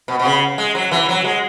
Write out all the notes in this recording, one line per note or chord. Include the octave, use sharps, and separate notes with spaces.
B2
B2
C#3
G#3
F#3
E3
F#3
G#3